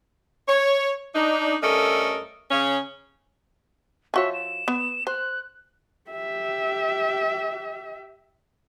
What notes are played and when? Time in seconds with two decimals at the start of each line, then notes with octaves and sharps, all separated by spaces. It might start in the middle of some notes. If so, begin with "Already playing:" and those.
0.48 C#5
1.15 D4 D#4
1.63 G2 A3 C#4 A4 A#4 D#5
2.51 C#3 C#4
4.14 F3 F#4 C#5 E5
4.33 E7
4.68 B3
5.07 C5 F#6
6.10 G4 E5